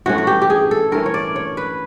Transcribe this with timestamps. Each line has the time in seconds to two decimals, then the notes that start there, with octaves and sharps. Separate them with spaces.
0.06 G2 E3 A3 C#4 F#4
0.18 F#4
0.27 G4
0.42 G4
0.50 G#4
0.71 A4
0.92 G2 E3 A3 C#4 A#4
1.06 C#5
1.14 D5
1.36 C#5
1.57 B4